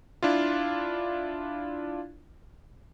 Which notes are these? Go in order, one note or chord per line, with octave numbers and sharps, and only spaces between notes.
D4 E4 F4